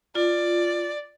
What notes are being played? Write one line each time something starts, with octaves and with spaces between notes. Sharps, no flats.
F4 D5